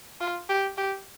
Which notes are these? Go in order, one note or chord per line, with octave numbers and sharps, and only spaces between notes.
F4
G4
G4